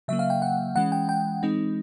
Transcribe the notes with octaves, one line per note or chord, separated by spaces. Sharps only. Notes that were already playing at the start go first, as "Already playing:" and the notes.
C#3 F#3 A#3 E5
F5
G5
F#5
E3 G#3 C#4 F#5
G5
G5
E3 G#3 C4 D#4